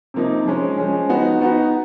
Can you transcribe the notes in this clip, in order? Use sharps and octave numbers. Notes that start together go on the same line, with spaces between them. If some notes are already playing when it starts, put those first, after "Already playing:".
C3 F3 A#3 D#4
F3 G#3 C#4
F3 G#3 C#4
B3 D#4 F#4
B3 D#4 F#4